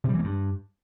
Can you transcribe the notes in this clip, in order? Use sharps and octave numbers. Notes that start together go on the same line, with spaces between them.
C3
G3
E3
A#3
G2